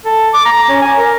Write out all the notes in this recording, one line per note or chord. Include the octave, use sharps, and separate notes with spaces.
A4
D6
A#5
C#4
G#5
A#4